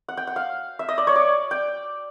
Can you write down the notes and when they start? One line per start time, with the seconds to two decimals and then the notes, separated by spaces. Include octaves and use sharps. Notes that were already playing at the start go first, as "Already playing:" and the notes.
0.09 F#5
0.17 G5
0.27 F#5
0.36 F5
0.79 E5
0.89 D#5
0.98 D5
1.07 C#5
1.16 D5
1.51 G5